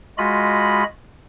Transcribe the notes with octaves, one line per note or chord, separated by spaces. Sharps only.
G#3 F4 F#4 D#5 B5